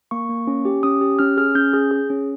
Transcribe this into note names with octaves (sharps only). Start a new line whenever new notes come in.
A#3 C#6
A#3
C#4
G4
C#4 D#6
G4
C#4 F6
G#4 F6
C#4 G6
G#4
G#4
C#4